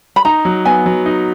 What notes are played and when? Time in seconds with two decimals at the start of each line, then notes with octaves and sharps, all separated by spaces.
0.16 B5
0.25 D#4 A#5
0.45 F#3
0.65 B3 G#5
0.86 F#3
1.06 D#4